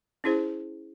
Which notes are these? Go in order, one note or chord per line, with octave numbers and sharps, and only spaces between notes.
C#4 E4 G#4 C5